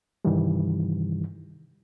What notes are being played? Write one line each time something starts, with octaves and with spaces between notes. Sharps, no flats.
G2 C3 D#3 E3 G3